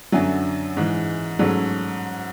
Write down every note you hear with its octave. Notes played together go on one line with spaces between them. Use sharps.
F#2 D3 F#3 E5 G#5
G#2 E3 G#3
G#2 F#3 A3 C#4